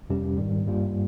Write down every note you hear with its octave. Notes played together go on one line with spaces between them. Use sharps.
F2 C3 G3 C#4 G4
G#2 D#3 G3
G2 G3 A#3 F4